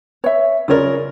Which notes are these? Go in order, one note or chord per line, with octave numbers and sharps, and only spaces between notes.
C#5 E5
C#3 F4 A#4 C#5 D5